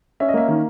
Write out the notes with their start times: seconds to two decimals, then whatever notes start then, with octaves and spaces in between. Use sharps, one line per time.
0.20 C#4 E5
0.29 D#5
0.34 A#3 E5
0.48 D#3